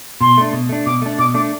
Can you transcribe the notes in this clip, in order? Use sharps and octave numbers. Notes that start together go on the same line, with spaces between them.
B2 C6
A3 D4
B2
A3 D4
B2 D6
A3 D4
B2 D6
A3 D4 D6